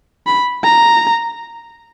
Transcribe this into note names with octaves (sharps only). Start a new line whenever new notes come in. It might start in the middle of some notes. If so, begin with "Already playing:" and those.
B5
A#5